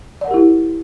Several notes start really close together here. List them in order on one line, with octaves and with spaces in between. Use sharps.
D5 F#5 A#4 G4 E4